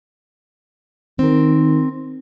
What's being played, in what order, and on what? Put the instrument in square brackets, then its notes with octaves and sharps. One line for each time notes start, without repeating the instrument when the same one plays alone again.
[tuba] D#3 [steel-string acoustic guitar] C4 A#4